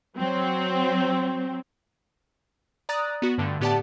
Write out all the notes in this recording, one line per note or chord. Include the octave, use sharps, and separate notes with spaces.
F#3 C4
D5 A#5 D#6 F#6 A6
B3 F#4
G2 D3 A3
A2 B3 G4 D5 F#5 A5